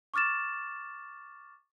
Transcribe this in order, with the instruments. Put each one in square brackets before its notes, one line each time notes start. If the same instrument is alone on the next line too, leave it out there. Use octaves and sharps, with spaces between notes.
[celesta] C#6 D6 F6 A6 E7